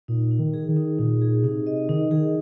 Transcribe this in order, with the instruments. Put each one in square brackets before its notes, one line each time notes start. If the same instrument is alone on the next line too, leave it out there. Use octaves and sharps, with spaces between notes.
[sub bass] A#2 [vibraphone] D#4
[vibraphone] D#4
[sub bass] D#3
[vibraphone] G#4
[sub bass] D#3
[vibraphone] D#4
[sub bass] A#2 [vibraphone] D#4
[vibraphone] G#4
[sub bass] C3 [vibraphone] D#4
[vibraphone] D#5
[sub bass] D#3 [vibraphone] D#4
[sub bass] D#3 [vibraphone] G#4